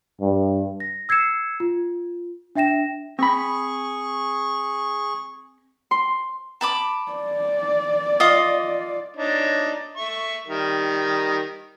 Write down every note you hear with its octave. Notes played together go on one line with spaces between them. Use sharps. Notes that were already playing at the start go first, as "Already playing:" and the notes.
G2
A#6
E6 G#6 C7 C#7 E7
F4
D4 E5 G5 A#6 E7
C4 G#4 B5 C#6
C6
A5 B5 D6
D5
F4 D#5
D4 D#4 C#5
E5 C#6
D#3 G3 A#4